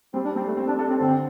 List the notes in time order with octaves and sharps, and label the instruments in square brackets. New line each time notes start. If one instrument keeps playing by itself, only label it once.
[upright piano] G3 [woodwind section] C4
[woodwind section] D4
[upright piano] G3 [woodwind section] C4
[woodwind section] A3
[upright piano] C4
[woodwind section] D4
[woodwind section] D4 [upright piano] A4
[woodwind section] C4
[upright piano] D3 [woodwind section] C4